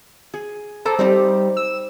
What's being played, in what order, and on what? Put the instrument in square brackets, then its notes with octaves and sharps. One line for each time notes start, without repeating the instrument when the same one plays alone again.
[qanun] G#4
[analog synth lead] A4 [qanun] C5 D5 A#5
[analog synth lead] G3 [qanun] C4 D#4 G4
[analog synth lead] E6